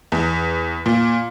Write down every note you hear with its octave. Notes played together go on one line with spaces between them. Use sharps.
E2
A#2